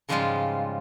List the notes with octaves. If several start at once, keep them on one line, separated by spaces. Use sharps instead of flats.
G#2 C#3 F3 G3 G#3 F4